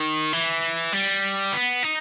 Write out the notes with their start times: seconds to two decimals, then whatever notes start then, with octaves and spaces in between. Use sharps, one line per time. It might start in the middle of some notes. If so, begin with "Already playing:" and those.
Already playing: D#3
0.33 E3
0.93 G3
1.52 B3
1.83 D#4